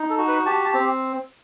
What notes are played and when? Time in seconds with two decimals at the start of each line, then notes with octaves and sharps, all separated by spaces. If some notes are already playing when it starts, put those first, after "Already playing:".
Already playing: D#4
0.10 A4
0.18 F#4
0.28 B4
0.46 G4 A5
0.65 A5
0.74 C4